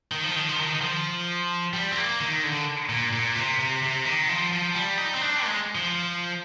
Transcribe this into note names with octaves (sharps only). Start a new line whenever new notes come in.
D#3
F3
D#3
F3
D#3
D#3
F3
G3
C4
A#3
D#3
D3
A#2
A#2
C3
C3
C3
D#3
F3
F3
G3
D#4
C4
D4
G#3
F3